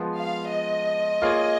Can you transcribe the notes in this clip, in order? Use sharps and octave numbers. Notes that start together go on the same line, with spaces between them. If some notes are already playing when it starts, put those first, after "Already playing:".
Already playing: F3 G#3 B3 F4
F5
D#5
A#3 F4 G#4 C#5